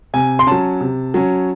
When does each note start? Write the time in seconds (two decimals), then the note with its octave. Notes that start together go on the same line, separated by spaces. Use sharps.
0.14 C3 G#5
0.39 C6
0.47 F#3 C#4 A5
0.81 C3
1.14 F#3 C#4